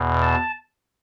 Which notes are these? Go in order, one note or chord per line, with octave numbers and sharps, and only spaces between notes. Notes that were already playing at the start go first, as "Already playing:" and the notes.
Already playing: E2 B2
A5